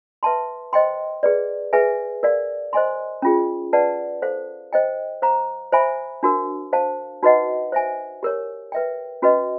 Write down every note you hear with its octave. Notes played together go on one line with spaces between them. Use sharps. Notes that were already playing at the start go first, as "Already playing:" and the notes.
B4 E5 A5 C6
C5 D#5 G5 C6
G#4 B4 D5
G#4 B4 E5 G#5
A#4 D5 F5
C5 D#5 G#5 C6
C#4 F4 G#4
B4 D5 F#5 A5
A4 C5 F5
C5 D#5 G5
C5 F5 A#5 C#6
C5 E5 G#5 B5
D4 F#4 A#4
C5 F5 A5
D#4 F#4 B4 D#5 F#5
C5 E5 G#5
G4 A#4 C#5
B4 E5 G5
C#4 F#4 B4 D#5